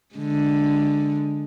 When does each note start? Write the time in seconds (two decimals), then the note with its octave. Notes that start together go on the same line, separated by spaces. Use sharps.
0.15 D3 G#3